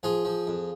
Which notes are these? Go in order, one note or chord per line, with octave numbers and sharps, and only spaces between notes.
F3 F4 G#4
F3
F2